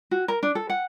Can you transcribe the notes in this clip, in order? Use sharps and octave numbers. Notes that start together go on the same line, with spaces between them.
F#4
A#4
D4
A4
F#5